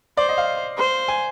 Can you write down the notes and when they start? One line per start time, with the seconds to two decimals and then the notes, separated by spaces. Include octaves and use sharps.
0.17 C5 D5
0.29 D#5
0.38 F5
0.78 C5
1.08 G#5